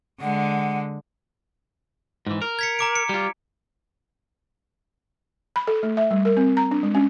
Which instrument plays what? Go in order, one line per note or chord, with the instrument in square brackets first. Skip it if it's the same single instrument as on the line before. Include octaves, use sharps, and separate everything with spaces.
[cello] D3 G#3 [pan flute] F#5
[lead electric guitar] G#2 E3
A#4
[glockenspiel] G#6 B6 C#7
A#5 D6 D7
C#7
[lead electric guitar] G3 F4
[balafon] B5
A4
A3
E5
G3
A#4
C4
A#5
D4
G#3
C#4